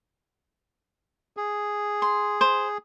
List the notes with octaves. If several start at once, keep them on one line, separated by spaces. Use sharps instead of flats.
G#4
C6
C5